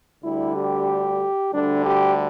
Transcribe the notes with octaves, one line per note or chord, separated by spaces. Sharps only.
D2 D3 G3 E4
G4
D2 D3 G3 D4
G4